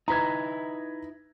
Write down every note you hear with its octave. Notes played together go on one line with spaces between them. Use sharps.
D#4 E4 B4 A#5 G#6